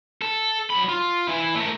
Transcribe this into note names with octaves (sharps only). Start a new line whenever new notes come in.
A4
F#3 B5
F4
E3 E4
A3 A#4